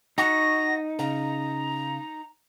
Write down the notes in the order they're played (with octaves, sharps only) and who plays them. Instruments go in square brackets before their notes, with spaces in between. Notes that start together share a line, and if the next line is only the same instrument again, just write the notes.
[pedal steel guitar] D#4 [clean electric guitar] F#4 [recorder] A#6
[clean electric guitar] C#3 [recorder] A#5